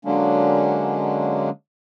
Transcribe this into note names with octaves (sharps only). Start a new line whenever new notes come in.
D3 F#3 G#3 A#3 C#4 D4